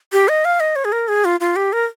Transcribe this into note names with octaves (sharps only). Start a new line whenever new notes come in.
G4
D#5
F5
D#5
C#5
G#4
A#4
G#4
F4
F4
G4
A#4